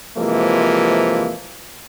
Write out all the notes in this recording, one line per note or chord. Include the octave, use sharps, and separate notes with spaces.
C3 E3 F3 G#3 A#3